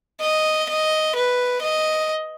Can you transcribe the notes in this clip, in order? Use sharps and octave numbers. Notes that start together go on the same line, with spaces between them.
D#5
D#5
B4
D#5